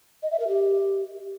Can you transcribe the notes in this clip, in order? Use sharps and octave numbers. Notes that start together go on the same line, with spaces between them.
D#5
E5
A#4
G4